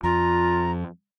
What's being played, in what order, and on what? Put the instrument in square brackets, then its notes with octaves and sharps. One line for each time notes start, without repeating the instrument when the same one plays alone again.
[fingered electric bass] F2 [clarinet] F4 [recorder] A#5